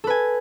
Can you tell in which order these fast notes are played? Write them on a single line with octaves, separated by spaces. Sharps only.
A4 B4 G#5